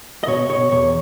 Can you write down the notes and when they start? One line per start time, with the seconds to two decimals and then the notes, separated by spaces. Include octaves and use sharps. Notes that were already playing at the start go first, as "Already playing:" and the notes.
0.23 D#5
0.27 B2 C#5
0.49 B2 C#5
0.72 E2 C#5